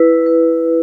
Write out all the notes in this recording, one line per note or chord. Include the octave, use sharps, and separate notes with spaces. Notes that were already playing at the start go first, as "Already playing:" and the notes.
Already playing: E4 B4
B4